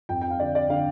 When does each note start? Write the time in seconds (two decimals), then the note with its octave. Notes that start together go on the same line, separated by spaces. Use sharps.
0.09 F2 G5
0.21 G5
0.30 F5
0.40 D3 D5
0.55 D5
0.69 D3 F5